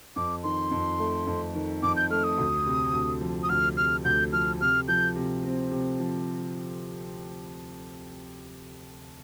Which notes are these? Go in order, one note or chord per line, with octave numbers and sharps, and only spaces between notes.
F2 D6
D#3 C6
F2
A3
F2
D#3
F2 D6
G6
A3 F6
D#6
D2
C3
D2
F3
D#6
D2 F6
C3 F6
D2 G6
F3 F6
C3 F6
F3 G6
C3
C4
C3
F3